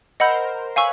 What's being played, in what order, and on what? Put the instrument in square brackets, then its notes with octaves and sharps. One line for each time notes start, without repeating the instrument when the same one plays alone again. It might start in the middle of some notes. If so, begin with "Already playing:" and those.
[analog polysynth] A#4 C5 [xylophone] D#5 F#5 B5 E6 G6
[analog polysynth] B4 C#5 [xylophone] F5 G#5 C#6 E6